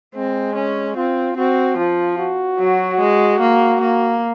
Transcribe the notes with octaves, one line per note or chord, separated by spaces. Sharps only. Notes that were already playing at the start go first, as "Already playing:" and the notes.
G#3 C4
C#4
C4 F4
C4 F#4
F3 F4
F#4
F#3
G#3
A#3
A#3